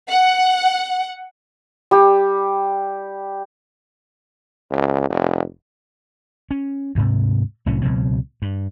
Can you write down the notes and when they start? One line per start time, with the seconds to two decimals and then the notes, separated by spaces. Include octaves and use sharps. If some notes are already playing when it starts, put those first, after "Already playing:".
0.11 F#5
1.91 G3 G4
4.71 C#2
5.10 F1
6.51 C#4
6.95 D2 G#2 C3
7.66 C2 A2 F#3 C#4
7.82 C#2 B2 F#3 C4
8.42 G2